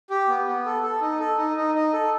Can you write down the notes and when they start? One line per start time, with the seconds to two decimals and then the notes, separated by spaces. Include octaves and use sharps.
0.10 G4
0.28 B3
0.47 B3
0.66 A4
0.83 A4
1.01 D#4
1.19 A4
1.38 D#4
1.56 D#4
1.74 D#4
1.93 A4